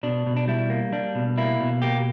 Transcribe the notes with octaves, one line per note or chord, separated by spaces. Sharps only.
B2 D4
B2
D4
G3 E4
A#3
G3 D4
B2
A#3 E4
B2
A#3 G4